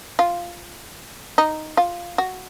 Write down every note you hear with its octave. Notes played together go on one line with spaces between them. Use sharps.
F4
D#4
F4
F#4